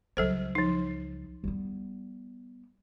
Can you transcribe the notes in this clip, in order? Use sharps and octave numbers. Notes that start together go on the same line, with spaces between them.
C#2 F#3 G3 A4 C5
F3 D#4
G3 B3